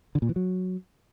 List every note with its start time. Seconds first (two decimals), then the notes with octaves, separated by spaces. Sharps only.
0.15 D3
0.22 A#2
0.29 E3
0.36 F#3